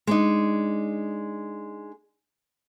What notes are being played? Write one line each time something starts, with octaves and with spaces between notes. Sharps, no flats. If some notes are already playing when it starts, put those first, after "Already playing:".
G#3 D4 D#4